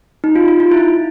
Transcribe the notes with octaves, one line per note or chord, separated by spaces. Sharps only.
D#4
F4
F4
F4
E4